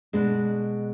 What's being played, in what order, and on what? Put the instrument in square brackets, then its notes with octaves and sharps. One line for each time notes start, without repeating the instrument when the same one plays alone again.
[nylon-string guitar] B2 G#3 D4